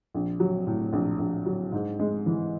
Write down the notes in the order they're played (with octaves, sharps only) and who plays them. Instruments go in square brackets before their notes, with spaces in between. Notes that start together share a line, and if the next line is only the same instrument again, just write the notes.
[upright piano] A#1
F#3
A2
A#1
A#1
F#3
G#2
G#3
E3